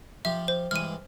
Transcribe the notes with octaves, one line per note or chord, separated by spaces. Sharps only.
F3 F4 G4 E5
C5
G2 E3 G#3 F6 D#7